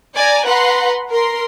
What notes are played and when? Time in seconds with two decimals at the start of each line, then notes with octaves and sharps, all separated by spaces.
0.15 D5 G#5 A#5
0.46 B4 F#5 A#5 C6
1.10 A#4 C6